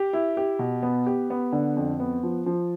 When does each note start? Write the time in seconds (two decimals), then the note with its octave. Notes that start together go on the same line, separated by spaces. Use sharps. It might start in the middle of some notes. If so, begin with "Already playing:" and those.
Already playing: G4
0.13 E4
0.37 G4
0.59 B2
0.83 B3
1.07 G4
1.30 B3
1.52 D3
1.76 F2
2.00 B3
2.23 F3
2.46 F3